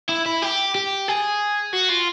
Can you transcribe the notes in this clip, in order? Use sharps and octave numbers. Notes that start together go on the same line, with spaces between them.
E4
E4
G4
G4
G#4
F#4
F4